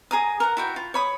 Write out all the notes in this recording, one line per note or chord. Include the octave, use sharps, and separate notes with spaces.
G#4 A#5 D#6
A#4 F#5
E4 F#4 G5
F4
C#5 B5 D#6